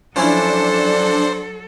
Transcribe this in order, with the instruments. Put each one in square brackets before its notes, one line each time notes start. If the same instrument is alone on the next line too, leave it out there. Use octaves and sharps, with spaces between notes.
[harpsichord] F3 C#4 E4 [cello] F#3 A4 [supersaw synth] D4 [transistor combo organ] C5